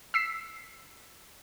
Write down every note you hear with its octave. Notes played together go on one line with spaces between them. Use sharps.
E6 B6 C7